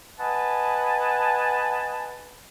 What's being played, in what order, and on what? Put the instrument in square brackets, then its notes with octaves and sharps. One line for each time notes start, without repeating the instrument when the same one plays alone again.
[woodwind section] B4 D#5 F#5 G#5 A5